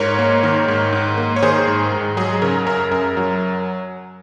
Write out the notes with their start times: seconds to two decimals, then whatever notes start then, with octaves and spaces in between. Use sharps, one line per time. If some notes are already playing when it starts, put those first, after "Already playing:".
Already playing: G#2 A#4 C#5
0.19 A#3
0.43 D#3
0.68 G#2
0.93 G#2
1.17 A#3
1.36 C#5
1.42 D#3 G#4 C5
1.67 G#2
1.92 G#2
2.17 F#3 G#4
2.42 C#3 A#4
2.67 F#2 A#4
2.91 F#2 A#4
3.17 F#3